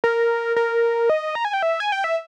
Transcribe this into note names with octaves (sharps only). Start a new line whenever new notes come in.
A#4
A#4
D#5
A#5
G#5
G5
E5
G#5
G5
E5